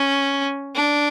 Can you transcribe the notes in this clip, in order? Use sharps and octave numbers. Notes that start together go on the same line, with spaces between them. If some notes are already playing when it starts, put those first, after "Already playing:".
Already playing: C#4
D4